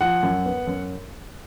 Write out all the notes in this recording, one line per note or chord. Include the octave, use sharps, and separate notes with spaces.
F3 F#5
F#2
B3
F#2